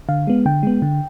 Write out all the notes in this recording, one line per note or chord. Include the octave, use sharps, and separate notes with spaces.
D3 F5
G#3 B3
D3 G5
G#3 B3
D3